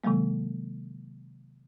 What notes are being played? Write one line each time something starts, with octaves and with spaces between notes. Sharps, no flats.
C3 D#3 F#3 G#3 A#3